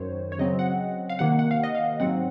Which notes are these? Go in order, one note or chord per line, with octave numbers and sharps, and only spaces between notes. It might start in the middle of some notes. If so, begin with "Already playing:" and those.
Already playing: F#2 D#3 F#3 C5 C#5
C#5
C#3 F#3 C4 D#5
F#5
F5
C3 D#3 A#3 F#5
F#5
F5
D#5
F5
G#2 F#3 C4 F#5